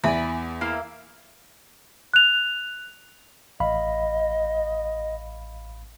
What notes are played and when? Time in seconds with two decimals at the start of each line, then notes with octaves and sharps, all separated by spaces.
0.04 E2 D5 E5 G#5 B5
0.61 A#3 E4 F5
2.14 F#6 F7
3.60 A1 D#5 F5 B5